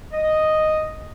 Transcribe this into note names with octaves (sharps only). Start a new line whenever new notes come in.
D#5